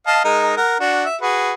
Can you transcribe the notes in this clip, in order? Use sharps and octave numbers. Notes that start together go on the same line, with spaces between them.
D#5 F5 A5
G#3 D#4 A#4
A#4 F#5
D4 F#4
E5
F#4 G#4 B4